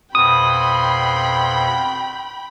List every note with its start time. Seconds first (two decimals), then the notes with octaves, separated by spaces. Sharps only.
0.15 F2 B2 G5 B5 C6 D#6